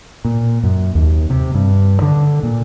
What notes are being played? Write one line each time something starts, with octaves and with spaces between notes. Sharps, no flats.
A#2
F#2
D#2
C3
G2
D3
A#2